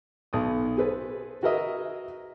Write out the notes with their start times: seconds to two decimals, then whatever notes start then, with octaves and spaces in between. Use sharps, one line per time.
0.33 B1 D#6
0.78 G#4 A4 B4 C5
1.43 F#4 G#4 A#4 B4 D#5 E5